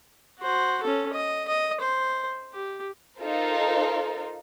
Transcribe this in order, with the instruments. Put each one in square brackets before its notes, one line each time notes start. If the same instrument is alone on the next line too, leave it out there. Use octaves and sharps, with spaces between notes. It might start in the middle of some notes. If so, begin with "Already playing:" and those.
[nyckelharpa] F#4 C5
C#4 A4
D#5
D#5
C5
G4
[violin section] D#4 F4 A4 A#4 C5